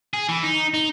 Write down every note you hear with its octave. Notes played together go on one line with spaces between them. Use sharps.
G#4
E3
D#4
D#4